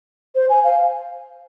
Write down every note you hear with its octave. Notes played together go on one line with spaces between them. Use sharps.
C5
G#5
F5